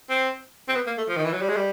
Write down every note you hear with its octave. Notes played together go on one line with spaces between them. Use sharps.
C4
C4
B3
A#3
A3
F3
D#3
E3
F#3
G3
G#3
G3